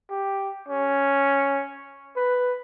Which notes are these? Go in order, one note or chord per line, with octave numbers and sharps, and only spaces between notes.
G4
C#4
B4